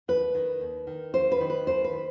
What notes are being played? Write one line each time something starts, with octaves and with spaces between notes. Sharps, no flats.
D#2 B4
D#3
D#2
D#3
D#2 C5
B4
D#3
B4
D#2 C5
B4
D#3